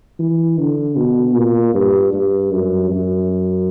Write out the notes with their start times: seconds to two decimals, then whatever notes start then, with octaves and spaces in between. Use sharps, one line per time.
0.19 E3
0.58 D3
0.96 B2
1.35 A#2
1.74 G2
2.13 G2
2.52 F#2
2.90 F#2